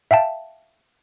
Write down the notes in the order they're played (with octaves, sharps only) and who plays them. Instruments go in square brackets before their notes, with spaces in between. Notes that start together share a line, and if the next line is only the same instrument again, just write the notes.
[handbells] E5 F5 G5 A5